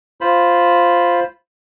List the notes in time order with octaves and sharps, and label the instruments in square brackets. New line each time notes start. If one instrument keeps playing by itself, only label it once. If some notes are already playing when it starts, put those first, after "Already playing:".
[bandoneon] F4 C5 B5